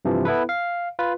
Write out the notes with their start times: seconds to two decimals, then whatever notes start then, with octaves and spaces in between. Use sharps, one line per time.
0.05 G2 C3 E3 F3
0.25 B3 E4 A4 B4
0.49 F5
0.99 F4 B4